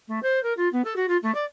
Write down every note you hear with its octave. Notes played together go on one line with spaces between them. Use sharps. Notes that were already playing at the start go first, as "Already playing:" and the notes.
A3
C5
A#4
F4
B3
A4
F#4
F4
A3
D5